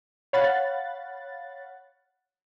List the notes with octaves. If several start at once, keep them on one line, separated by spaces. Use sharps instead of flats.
C#5 F5 F#5 B5 F#6 A6